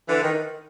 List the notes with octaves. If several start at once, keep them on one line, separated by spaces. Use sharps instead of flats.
D3 E3
D#3